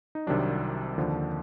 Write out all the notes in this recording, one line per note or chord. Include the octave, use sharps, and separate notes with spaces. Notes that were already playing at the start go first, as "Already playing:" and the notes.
D#4
C2 C3 D#3 F#3 D4
D#2 D3 F3